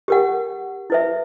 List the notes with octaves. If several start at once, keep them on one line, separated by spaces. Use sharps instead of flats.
G4 A#4 F#5
E4 B4 E5